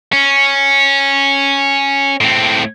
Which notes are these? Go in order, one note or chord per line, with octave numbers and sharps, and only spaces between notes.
C#4
A2 C4